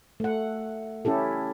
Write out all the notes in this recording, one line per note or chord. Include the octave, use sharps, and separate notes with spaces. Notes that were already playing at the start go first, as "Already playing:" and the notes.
A3 F#5
C#4 E4 G4 A4